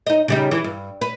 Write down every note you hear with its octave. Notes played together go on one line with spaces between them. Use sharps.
D#4 D#5
C#3 G3 D#4
E3
G2
B4